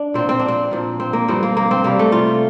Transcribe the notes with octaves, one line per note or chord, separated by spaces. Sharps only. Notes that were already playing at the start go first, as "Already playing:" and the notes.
Already playing: D4
A#2 F3 C4
C4
D4
C4
A#2 F3
C4
A#3
G2 F3 C4
A#3
A#3
C4
C3 G3 A#3
A3
F4